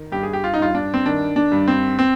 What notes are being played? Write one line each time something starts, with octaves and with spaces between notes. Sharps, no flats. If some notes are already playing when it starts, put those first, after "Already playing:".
Already playing: D#3
G2 G4
G#4
G4
F4
D#4
G2 F4
D4
C4
D#3 D4
D4
G2
C4
C4